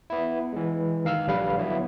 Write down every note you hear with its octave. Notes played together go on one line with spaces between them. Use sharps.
B3 E4
E3 G#3
D#3 F5 E6 F6
A#1 D3 G3 B4 F5
F#3 B3 E4